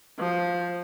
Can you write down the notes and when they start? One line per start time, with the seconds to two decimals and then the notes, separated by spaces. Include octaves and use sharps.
0.19 F3